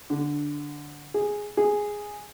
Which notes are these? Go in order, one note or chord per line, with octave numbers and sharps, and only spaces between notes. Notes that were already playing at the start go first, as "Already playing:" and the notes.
D3
G#4
G#4